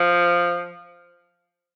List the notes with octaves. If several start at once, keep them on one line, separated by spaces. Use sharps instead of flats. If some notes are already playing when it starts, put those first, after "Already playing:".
Already playing: F3